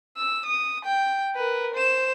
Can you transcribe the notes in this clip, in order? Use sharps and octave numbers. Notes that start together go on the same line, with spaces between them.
E6
D#6
G5
A#4 B4
C5 E7